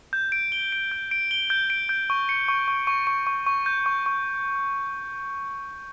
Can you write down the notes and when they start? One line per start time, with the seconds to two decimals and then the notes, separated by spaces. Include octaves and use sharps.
0.13 G6
0.32 D7
0.52 G7
0.72 D7
0.91 G6
1.11 D7
1.31 G7
1.50 G6
1.70 D7
1.89 G6
2.10 C#6
2.29 C#7
2.48 C#6
2.68 C#6
2.87 C#6
3.07 C#6
3.27 C#6
3.46 C#6
3.66 G6
3.86 C#6
4.06 C#6